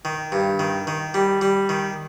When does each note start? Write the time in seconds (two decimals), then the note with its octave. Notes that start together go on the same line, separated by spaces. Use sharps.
0.05 D#3
0.32 G2
0.59 D#3
0.87 D#3
1.14 G3
1.41 G3
1.69 D#3